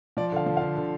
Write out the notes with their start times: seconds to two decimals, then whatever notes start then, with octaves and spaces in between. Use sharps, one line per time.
0.17 F3 D5
0.32 D3 F5
0.46 F3
0.57 D3 F5
0.76 D3